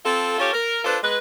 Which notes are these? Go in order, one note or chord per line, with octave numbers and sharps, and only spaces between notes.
C4 F4 A4
C#4 F4 G4 A4 C#5
A#4
D4 F4 A4 B4 C5
G#3 B4